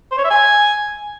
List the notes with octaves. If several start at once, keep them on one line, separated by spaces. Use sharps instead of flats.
C5
C#5
E5
G#5